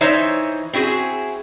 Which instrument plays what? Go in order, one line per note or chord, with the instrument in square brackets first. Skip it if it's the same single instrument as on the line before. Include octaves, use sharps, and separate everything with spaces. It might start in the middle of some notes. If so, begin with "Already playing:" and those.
[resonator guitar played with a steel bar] E3 D#4 C5 C#5 E5
C4 E4 F#4 G#4